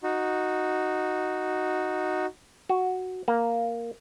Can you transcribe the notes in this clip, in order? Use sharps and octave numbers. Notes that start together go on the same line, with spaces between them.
D#4 F#4
F#4
A#3